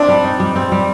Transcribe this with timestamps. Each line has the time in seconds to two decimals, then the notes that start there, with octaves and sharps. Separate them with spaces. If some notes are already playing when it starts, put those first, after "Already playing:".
Already playing: C4 D4
0.08 G3
0.24 D#4
0.40 G3
0.56 C4
0.72 G3